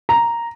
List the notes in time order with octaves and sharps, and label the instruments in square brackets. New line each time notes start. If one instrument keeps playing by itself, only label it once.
[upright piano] A#5